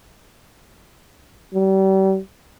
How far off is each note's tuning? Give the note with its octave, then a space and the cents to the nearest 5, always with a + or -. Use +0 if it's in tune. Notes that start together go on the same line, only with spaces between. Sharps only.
G3 -35